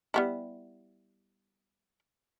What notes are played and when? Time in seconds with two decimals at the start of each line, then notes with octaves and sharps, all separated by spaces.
0.14 G3 B3 E4